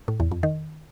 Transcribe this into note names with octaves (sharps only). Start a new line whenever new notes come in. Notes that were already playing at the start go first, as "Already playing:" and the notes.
A2
E2
F2
D#3